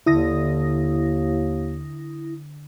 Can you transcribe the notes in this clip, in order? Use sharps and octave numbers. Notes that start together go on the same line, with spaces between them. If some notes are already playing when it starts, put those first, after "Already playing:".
D#2 D3 E4 D#6 A#6